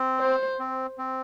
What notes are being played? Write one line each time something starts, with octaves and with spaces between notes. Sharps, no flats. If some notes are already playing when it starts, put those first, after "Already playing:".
Already playing: C4
C5
C4
C4